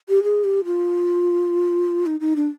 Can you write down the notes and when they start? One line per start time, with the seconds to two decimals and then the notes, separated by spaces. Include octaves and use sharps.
0.09 G4
0.23 G#4
0.44 G4
0.65 F4
2.06 D#4
2.20 D#4
2.36 D4